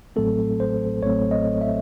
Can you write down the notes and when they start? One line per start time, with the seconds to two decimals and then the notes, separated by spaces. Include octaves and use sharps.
0.16 A1 A2 F#3 A3 C4 A4
0.60 C5
1.03 A1 A2 F#3 A3 C4 C#5
1.31 D#5
1.61 E5